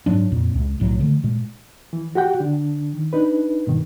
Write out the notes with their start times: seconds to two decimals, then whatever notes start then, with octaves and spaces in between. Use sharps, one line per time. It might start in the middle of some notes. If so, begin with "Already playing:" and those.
0.06 G#2 F#3 D4
0.32 F2 A#2
0.54 C#2
0.80 B1 A2 F#3
0.99 D3 E3 A3
1.24 A#2 G#3
1.93 E3
2.15 F#4 G4 F#5 G5
2.40 D3 D4
2.94 D#3
3.13 D4 D#4 B4
3.67 G2 B2 D#3